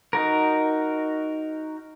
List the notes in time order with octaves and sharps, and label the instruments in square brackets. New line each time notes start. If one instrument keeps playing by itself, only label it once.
[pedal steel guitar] D#4 F#4 A#4